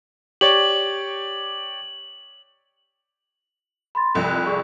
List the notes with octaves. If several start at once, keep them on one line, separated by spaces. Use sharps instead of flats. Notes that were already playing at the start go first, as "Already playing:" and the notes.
G4 C#5 D5 F#7
B5 C6 A6
F1 C2 F2
F#6
G#4 D5 C#6